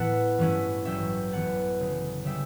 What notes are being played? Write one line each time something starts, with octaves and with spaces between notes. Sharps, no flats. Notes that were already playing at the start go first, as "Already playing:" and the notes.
Already playing: A2 E3 B3 E4 F#5 A5
G2 E3 A3 C#4 E4
A1 G2 F#3 C#4 E5 G5
F#2 E3 B3 E4 F#5 A5
D2 C#3 F#3
C#3 G3 E5 G5